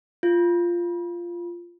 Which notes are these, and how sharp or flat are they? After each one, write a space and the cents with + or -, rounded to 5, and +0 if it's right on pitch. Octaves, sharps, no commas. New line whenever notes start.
F4 -10